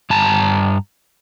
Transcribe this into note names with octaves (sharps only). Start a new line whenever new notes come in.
G2 A5 A#5